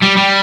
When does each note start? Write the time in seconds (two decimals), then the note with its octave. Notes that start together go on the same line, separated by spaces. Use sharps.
0.03 G3
0.17 G3